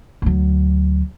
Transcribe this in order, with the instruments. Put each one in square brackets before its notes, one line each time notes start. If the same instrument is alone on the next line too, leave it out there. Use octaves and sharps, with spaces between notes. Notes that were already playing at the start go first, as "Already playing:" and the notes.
[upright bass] D2 F#3